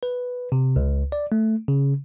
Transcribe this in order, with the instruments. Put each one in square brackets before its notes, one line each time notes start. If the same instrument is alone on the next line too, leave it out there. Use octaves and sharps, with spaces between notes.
[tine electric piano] B4
C3
C#2
D5
A3
C#3